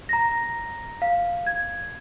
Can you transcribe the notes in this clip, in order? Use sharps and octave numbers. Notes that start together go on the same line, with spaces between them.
A#5 A#6
F5
G#6